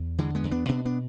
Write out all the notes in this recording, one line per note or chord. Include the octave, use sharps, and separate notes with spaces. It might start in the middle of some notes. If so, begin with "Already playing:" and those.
Already playing: E2
D3 E3 G#3
G#3 B3
E2
B3 D4
B2 B3 D4
B3 D4